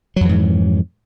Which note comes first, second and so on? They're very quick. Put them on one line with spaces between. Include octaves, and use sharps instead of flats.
F#3 F2 E3 G#2